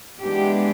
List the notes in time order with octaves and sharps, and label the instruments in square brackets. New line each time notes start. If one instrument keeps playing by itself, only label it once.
[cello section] E3 G#3 B3 D4 G4